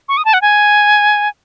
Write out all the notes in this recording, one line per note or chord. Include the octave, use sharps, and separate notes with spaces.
C#6
D#6
A5
F#5
G#5